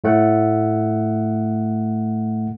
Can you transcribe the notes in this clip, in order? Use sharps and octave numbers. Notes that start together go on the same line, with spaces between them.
A2 A3 F#5